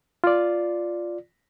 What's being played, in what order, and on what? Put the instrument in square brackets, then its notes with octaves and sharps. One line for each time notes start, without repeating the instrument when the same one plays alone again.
[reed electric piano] F4 D5